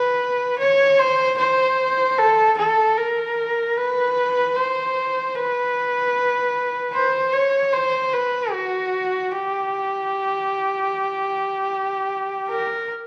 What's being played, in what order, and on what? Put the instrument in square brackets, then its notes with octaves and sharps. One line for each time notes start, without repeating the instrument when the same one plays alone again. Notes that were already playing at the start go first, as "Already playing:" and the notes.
Already playing: [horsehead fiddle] B4
C#5
C5
C5
A4
A4
A#4
B4
C5
B4
C5
C#5
C5
B4
F#4
G4
A#4